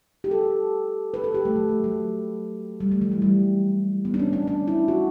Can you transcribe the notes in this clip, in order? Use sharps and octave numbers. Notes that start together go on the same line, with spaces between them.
G4
A4
B4
A4
G4
A3
F#3
F#3
F#3
G3
A3
E3
F#3
G3
B3
D4
C#4
D4
D4
E4
F#4